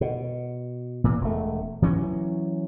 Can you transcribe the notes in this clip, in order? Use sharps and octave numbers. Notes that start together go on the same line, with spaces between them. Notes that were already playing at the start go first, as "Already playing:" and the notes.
B2
A#2 E3
E1 A3
E3 F#3 C#4